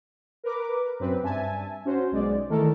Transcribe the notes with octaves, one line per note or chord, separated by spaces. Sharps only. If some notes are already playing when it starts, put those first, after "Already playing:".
A#4 B4 D6
F#2 C4 B4
G2 E5 G#5 A5
C#4 F#4 C5
B1 G#3 D5
D#3 E3 A3 A4 A#4